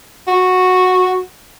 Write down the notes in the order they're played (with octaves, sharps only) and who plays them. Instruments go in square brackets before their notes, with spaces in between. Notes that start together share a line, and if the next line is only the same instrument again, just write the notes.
[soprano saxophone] F#4